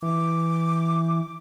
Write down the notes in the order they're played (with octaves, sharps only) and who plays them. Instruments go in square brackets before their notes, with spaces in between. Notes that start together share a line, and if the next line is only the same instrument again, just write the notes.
[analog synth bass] E3 [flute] D6